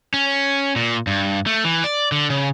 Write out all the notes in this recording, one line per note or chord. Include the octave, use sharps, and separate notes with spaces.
C#4
A#2
G2
A3
E3
D5
D3
C#3